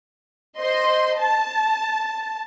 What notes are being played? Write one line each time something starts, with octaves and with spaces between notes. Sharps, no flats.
C5 D#5 C6
A5